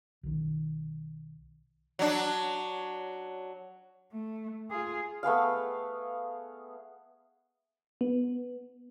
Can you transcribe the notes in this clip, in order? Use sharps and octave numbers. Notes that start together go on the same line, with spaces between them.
B1 D#3
F#3 D4
A3
F4 G#4
A3 B3 G#4 F5
B3